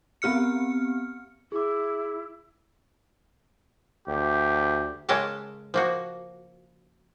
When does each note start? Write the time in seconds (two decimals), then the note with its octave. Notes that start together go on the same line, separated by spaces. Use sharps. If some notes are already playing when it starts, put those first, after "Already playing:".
0.22 B3 C4 G4 F6 C#7
1.52 E4 G#4 D6
4.07 D2 G4
5.09 C#3 G#3 C#4 A4 A#4 A5
5.74 F3 A#3 F#4